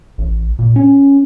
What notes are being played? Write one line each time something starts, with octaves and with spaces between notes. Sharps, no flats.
A1
A#2
C#4